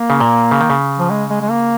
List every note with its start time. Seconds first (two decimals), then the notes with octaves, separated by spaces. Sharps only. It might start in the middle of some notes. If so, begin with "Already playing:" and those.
Already playing: A#3
0.10 C#3
0.20 A#2
0.51 C#3
0.61 D#3
0.70 C#3
0.99 F3
1.10 G#3
1.30 G#3
1.41 G#3
1.50 A#3